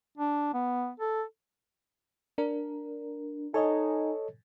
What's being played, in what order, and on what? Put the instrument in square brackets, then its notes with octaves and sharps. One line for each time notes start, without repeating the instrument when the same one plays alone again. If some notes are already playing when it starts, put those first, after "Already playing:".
[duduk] D4
B3
A4
[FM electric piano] D4 A#4
[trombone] D#4 [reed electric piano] A4 C#5 D#5 [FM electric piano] G#5